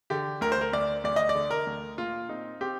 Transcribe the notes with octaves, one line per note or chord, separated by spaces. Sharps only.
D3 G4
D2 A#4
C5
A#4
D2 D5
D2 D5
D#5
D5
D3
A#4
D2
A#2 F4
C4 D#4
C4 G4